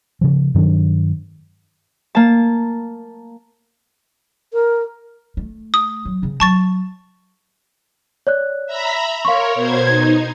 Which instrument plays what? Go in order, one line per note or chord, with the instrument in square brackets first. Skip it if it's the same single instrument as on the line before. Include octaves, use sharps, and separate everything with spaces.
[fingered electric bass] C#3 F3
G2 D#3 F#3 D4
[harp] A#3 A5
[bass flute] A#4
[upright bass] A3
[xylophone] D#6
[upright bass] F#3
C#3 C4
[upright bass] F#3 [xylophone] A5 C#6 A6
[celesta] C#5 D5 F#6
[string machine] E5 A#5 B5
[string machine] A#4 C#5 [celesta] F5 C6 C#6
[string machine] B2 C5 G#6
[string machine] D#4 [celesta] G#6